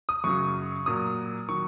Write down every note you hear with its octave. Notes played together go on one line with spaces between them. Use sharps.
D#6
F#2 C#3 F#3 C#6
A#2 F#3 D#6
D#3 F#3 C#6